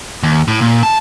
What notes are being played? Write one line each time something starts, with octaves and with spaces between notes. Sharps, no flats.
D#2
A2
A#2
A5